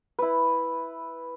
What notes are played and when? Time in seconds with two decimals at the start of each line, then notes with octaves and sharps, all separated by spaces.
0.19 E4 B4